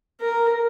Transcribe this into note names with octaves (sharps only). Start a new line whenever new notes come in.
A#4